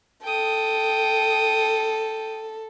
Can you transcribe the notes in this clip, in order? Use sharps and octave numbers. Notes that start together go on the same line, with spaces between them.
A4 G5 D#6